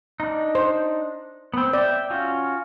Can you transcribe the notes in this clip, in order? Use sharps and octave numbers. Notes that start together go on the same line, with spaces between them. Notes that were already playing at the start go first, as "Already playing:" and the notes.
D4 D#4
C5
B3 C4
D5 E5 G5
C#4 F4 F#4